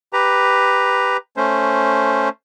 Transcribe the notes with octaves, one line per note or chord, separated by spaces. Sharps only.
G4 B4 A#5
A3 C#4 C5